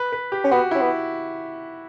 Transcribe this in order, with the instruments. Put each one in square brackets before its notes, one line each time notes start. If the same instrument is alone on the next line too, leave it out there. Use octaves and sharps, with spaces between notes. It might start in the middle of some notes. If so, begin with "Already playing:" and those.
Already playing: [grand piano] B4
B4
G4
[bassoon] C#4
[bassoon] B3 [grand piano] F#4
[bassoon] C#4 [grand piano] E4
[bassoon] B3